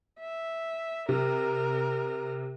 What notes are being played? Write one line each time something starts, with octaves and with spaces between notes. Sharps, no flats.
E5
C3 A#4